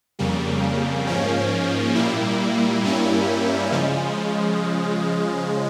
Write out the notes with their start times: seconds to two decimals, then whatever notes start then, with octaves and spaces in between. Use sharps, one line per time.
0.19 F2 C#3 G3 A#3
1.07 G#2 F3 A#3 C#4
1.95 A#2 G3 A#3 E4
2.83 G2 G3 A#3 C#4 E4
3.72 C#3 F3 G#3